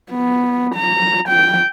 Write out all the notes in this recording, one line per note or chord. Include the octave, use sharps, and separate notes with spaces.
B3
A#5
G5